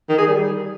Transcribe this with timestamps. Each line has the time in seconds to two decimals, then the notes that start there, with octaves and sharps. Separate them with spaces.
0.09 D#3
0.18 G#4
0.28 G3